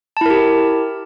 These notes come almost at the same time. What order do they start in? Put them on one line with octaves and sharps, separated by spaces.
A5 E4 A#4 G4